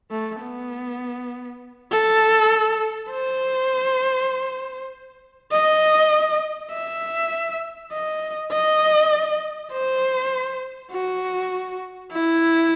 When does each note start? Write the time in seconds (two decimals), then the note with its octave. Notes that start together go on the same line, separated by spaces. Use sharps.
0.11 A3
0.41 B3
1.91 A4
3.11 C5
5.52 D#5
6.72 E5
7.92 D#5
8.52 D#5
9.72 C5
10.92 F#4
12.12 E4